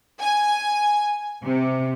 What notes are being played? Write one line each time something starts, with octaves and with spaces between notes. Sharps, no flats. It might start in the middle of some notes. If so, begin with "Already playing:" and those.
G#5
C3